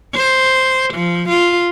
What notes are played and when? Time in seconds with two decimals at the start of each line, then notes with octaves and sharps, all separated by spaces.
0.15 C5
0.94 F3
1.29 F4